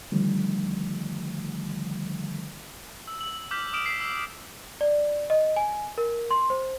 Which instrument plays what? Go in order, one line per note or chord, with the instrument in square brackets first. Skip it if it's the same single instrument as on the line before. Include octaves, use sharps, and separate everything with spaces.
[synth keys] D3 D#3 F3 G3 A3
[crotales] E6
E6 F#7
D6 F6 G6 B6
D6 D#6 F6 D7 E7
B6 C7
E6
[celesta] D5
D#5
G#5
A#4
C6
C5